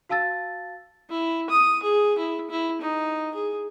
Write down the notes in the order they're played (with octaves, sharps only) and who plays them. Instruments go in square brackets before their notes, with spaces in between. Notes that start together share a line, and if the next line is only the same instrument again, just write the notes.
[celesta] F#4 F5 A5 E6 A6
[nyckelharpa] E4
D#6
G#4
E4
E4
D#4
G#4